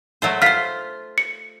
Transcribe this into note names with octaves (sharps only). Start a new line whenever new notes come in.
F#3 A3 C5
F4 C5 F6 B6
C#7